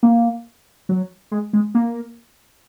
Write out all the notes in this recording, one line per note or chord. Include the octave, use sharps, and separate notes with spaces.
A#3
F#3
G#3
G#3
A#3